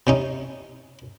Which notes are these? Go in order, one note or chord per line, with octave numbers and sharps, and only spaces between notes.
C3 C#4 D#4